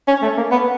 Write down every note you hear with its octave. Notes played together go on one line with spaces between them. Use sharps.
C#4
A3
A#3
B3